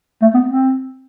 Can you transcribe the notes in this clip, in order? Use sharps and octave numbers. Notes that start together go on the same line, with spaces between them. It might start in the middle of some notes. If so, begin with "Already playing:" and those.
A3
B3
C4